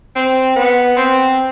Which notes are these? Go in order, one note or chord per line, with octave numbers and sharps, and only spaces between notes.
C4
B3
C4